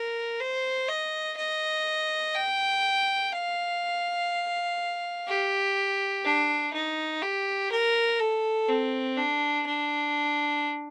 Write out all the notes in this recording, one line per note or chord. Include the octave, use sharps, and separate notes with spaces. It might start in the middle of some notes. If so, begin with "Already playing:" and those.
Already playing: A#4
C5
D#5
D#5
G5
F5
G4
D4
D#4
G4
A#4
A4
C4
D4
D4